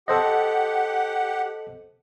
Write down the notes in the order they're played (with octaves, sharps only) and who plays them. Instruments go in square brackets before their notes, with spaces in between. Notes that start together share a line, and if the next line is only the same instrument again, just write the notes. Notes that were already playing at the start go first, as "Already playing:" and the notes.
[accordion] G4 F#5 [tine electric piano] A4 C5 D#5